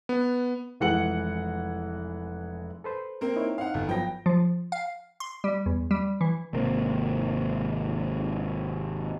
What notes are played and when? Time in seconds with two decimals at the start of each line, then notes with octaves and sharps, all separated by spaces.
0.09 B3
0.80 F1 E3 G#3 F#5 C#7 F#7
2.84 A4 B4 C5
3.21 A#3 C4 A#4
3.36 D#4 E4 C#5
3.58 C4 D#4 F5 F#5
3.74 G1
3.89 F3 F#3 B3 G5 A#6
4.26 F3
4.72 F5
5.20 C6
5.44 G3
5.66 E2
5.91 G3
6.21 E3
6.53 G#1 C3 A#3 C4